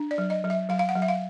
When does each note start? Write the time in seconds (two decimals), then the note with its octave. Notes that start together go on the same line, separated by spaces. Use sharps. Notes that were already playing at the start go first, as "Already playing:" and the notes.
Already playing: D4
0.11 D5
0.18 F#3
0.30 D#5
0.44 F#3
0.50 E5
0.69 F#3 F5
0.79 F5
0.89 F#5
0.95 F#3
1.02 E5
1.08 F5